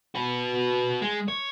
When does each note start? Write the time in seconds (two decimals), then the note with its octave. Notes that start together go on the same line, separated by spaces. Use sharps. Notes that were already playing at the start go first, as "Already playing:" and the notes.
0.15 F#4 B4
1.02 G#3
1.28 C#5